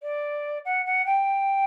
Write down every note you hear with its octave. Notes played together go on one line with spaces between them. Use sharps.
D5
F#5
F#5
G5